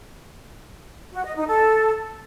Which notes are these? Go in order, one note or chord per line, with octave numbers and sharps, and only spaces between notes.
F#4
D#5
D#4
A4